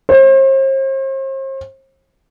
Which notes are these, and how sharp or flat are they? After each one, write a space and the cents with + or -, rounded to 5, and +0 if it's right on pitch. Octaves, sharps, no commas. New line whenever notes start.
C5 +40